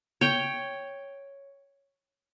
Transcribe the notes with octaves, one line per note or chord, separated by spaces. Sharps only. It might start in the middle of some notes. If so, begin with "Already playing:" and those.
C#5 G5